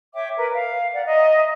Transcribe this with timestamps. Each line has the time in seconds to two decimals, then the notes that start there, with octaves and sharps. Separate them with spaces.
0.13 C#5 E5 G5 D6
0.37 A#4 B4
0.52 F5
0.93 D5 F#5
1.05 D#5 E5 A#5